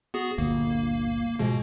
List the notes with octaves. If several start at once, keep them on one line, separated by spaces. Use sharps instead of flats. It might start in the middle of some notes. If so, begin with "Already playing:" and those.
B3 F#4 G#4
G1 D2 A#2 A#3
G#2 B2 F3 G#3